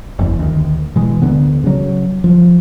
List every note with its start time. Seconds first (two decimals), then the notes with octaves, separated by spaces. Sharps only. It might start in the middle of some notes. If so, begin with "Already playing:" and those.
0.19 F#1 E2
0.39 D2 D#3
0.96 B2 E3 G#3
1.22 D2 D3 B3
1.64 C#3 F#3
2.24 F3